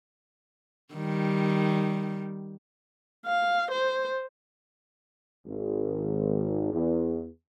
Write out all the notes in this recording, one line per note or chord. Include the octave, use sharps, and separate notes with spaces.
D#3 G3
F5
C5
G#1
E2